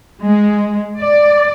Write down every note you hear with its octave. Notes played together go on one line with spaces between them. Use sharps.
G#3
D5